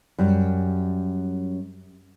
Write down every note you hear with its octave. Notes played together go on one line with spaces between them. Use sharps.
F#2 G3